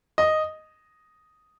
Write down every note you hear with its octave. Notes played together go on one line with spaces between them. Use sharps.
D#5